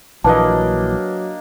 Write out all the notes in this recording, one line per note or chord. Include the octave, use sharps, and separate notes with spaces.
A#1 E3 F#3 A#3 D4 B4 D#5 A5